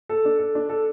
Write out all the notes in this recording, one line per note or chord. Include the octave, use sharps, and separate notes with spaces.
A4
D4
A4
D4
A4